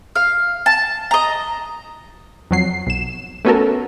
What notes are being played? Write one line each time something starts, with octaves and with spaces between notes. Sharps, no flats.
F5
A5
D#5 A#5
F2 F#3 C7
B1 E7
A3 B3 C#4 F#4 A4 A#4